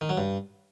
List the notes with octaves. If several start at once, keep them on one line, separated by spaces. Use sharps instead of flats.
D#3
F#3
G2